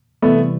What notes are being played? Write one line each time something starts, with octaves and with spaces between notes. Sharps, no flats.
C3 E3 G3 A3 B3